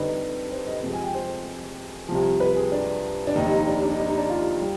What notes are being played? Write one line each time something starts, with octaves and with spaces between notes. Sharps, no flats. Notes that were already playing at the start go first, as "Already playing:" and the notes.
Already playing: F2 D3 G3 D#4 B4
C5
D#5
F2 C3 F3 G#3
G#5
G5
C5
C2 C3 F3
B4
G#4
D4
D4
F1 D#2 D#3 D#4
D#4
D#4
D4
D4
D#4
D4
D#4
D4
F4
G3